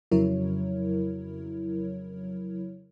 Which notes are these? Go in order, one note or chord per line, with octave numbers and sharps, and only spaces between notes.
F2 C#3 F#3 E4 A#4 C#5